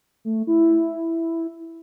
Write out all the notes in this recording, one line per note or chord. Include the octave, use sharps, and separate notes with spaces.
A3
E4